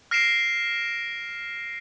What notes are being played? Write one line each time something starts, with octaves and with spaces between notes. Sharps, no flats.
F6 A#6 C7 D7 E7